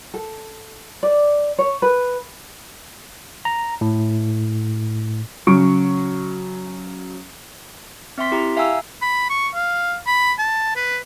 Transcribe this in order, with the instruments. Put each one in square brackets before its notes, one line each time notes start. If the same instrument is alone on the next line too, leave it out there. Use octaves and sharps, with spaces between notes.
[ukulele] A4
D5
C#5
B4
[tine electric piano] A#5
A2
[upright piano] C#3 F#3 C#6 D7
[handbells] C4 E5 G5 C6 B6
E4 G4 G5 A#5
E5 F5 G5 G#5 A#5 E6
[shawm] B5
C#6
F5
B5
A5
B4